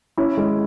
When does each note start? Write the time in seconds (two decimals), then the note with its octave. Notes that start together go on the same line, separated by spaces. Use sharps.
0.17 C#4 E4
0.37 G#3